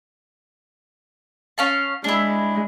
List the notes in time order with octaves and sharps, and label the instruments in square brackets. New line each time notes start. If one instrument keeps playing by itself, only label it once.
[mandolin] C#4 F5 A5
[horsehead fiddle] G#3 [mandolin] D4 E4